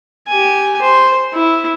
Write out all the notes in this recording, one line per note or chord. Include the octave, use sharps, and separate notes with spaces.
G4 G#5
C5
E4